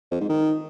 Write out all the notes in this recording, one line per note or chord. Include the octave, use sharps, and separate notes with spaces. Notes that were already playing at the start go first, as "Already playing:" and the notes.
F2
G#2
D#3